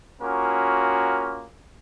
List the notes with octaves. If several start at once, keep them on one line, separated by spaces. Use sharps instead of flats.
A#3 C#4 F4 F#4 G#4 A#4